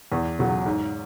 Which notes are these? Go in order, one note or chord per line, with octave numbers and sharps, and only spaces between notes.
E2
C#3 F#3
G#2